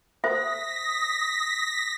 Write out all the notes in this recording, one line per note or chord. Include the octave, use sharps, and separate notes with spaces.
C5 E5 D#6 A#6 B6